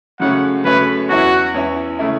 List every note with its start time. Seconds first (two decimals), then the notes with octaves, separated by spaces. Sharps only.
0.20 F#2 C#3 A3 C#4 F#5
0.64 F#2 C#3 A3 C#4 B4
1.09 E2 E3 C#4 E4 F#4
1.54 E2 E3 C#4 E4
1.99 C#3 A3 E4